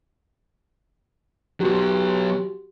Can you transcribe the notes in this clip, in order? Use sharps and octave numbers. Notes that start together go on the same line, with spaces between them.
F#3 B3 F#4 G4